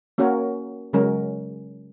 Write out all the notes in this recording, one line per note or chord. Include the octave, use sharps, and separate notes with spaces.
A#3 C#4 F#4 A#4 C#5
C#3 F#3 G#3 C#4 A#4